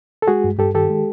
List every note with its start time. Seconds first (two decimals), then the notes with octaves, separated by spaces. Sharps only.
0.22 A4
0.27 G#3 F#4 G#4
0.44 G2
0.59 G2 G4 A4
0.75 D#3 G4 A4
0.90 G#3